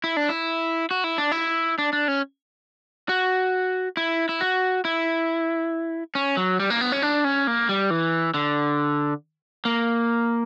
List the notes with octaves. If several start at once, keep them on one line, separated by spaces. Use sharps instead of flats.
E4
D4
E4
F#4
E4
D4
E4
D4
D4
C#4
F#4
E4
E4
F#4
E4
C#4
F#3
G3
A#3
B3
C#4
D4
C#4
A#3
G3
E3
D3
A#3